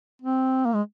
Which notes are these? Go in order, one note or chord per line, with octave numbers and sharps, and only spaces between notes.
C4
A#3
G#3